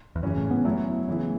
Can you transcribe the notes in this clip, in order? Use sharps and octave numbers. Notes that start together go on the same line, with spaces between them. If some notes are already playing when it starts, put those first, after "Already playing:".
E2
F#2 C#3 E3 C#4
A2
B3
F#2 F#3 A3 B3 E4
C#3 E3 B3 E4